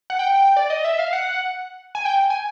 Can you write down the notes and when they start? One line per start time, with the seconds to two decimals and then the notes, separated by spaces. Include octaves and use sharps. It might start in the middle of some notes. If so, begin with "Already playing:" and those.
0.10 F#5
0.19 G5
0.56 D5
0.70 D#5
0.84 E5
0.99 F5
1.13 F#5
1.95 G#5
2.05 G5
2.30 G#5